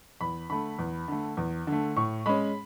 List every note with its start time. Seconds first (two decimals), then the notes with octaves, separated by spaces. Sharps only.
0.21 E2 B5
0.50 D3 A3 B5
0.79 E2
1.08 D3 A3
1.37 E2
1.67 D3 A3
1.96 A2 C#6
2.26 G#3 C#4 B5